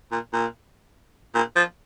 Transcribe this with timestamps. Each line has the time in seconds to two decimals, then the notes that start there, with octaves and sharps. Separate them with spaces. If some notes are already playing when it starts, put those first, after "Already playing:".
0.12 A#2
0.33 A#2
1.35 A#2
1.56 F3